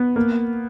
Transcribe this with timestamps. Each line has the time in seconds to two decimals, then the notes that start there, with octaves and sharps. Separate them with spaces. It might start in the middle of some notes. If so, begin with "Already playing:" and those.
Already playing: B3
0.16 A#3